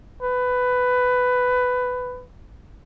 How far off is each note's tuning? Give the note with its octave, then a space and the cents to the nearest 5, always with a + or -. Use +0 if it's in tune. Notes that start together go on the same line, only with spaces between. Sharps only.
B4 +15